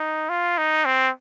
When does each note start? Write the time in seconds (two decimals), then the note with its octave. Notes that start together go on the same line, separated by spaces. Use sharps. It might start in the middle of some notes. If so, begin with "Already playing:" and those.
Already playing: D#4
0.29 F4
0.58 D#4
0.86 C4